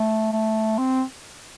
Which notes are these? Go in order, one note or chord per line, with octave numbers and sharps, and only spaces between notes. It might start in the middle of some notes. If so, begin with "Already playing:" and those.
Already playing: A3
A3
C4